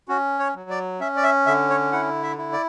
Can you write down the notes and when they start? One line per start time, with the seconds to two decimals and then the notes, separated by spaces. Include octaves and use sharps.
0.08 C#4 F#4
0.39 C#5
0.55 F#3
0.70 D5
1.00 C#4 E5
1.17 D5
1.24 E5
1.46 D3 E5
1.69 C#5
1.92 E4 F#5
2.23 E5
2.38 E4
2.53 D5